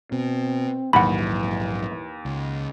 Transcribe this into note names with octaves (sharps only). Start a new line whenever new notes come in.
B2 C4
A#1 D#2 G#2 E3 F#3 F#5 B5
C#2